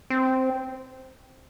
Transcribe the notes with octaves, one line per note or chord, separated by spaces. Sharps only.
C4